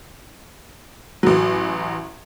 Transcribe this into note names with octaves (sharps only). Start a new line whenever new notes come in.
A1 F#3